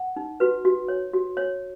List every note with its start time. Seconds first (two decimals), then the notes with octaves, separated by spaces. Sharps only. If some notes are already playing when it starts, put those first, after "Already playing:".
Already playing: F#5
0.16 D#4
0.40 F#4 B4
0.65 F#4
0.88 C#5
1.13 F#4
1.37 C#5